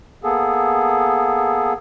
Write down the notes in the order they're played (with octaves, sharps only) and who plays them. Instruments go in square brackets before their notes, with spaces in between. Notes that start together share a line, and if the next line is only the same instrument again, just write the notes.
[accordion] A#3 B3 G#4 A4